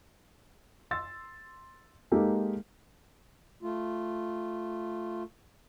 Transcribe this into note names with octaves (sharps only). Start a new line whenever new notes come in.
C6 E6 A6
G#3 A#3 D#4 G4 A4
A3 F4